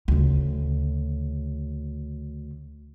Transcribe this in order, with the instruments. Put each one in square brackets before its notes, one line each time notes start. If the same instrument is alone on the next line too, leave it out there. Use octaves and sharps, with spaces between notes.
[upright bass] D2 C#3